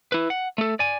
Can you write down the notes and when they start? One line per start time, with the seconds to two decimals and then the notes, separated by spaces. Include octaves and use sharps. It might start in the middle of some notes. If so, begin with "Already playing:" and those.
0.12 E4 B4
0.30 F#5
0.58 A3 A4
0.79 D5 G#5